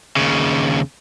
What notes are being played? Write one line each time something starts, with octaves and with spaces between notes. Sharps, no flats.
D#2 C#3